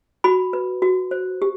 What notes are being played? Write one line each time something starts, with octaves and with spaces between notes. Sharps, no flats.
F#4 B5
B4
F#4
C5
G4